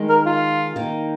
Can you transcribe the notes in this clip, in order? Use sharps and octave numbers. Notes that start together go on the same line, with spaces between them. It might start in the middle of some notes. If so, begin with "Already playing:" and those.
Already playing: D#3 G#3 D#4
A#4
F4
D#3 A#3 D#4